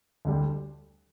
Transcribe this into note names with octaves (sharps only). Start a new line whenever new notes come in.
D2 D3 G3